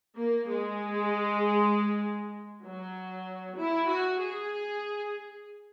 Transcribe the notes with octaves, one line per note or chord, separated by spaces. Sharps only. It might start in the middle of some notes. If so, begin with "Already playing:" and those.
A#3
G#3
F#3
E4
F#4
G#4